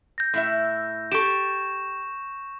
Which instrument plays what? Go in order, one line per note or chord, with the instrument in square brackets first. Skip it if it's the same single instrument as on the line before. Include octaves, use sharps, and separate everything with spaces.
[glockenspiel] G6 A#6
[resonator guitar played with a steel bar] A2 E4 E5
[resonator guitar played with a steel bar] G4 A4 [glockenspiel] C#6 E7